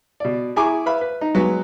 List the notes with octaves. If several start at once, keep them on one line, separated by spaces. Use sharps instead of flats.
B2 D5
E4 G#4 G#5 A#5 C#6 D6
B4 E5 F5 B5
B4
D#4
F#3 G#3 B3 F#4 B4